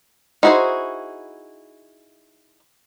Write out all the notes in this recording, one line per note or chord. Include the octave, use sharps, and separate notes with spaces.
D#4 E4 F#4 G#4 C5